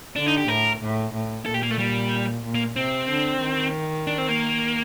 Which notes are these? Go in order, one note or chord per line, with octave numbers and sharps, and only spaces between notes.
D3 D4
D#4
G4
A2 A#4
A2
A2
A#2 A4
G4
A#3
A3
G3
A#2
A#3
C3 C4
D3
D#3
D4
C4
A#3